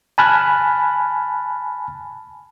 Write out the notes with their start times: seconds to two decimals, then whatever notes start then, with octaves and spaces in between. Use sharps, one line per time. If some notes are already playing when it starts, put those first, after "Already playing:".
0.18 G#5 A5 B5 F6 F#6